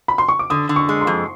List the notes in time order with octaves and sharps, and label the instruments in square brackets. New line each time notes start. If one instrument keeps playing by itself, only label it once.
[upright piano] B5
C6
C#6
D6
[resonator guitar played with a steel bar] D3 [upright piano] D#6
[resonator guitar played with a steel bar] D3
[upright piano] C#6
[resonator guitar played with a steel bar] G#3
[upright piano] C6
[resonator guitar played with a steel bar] F2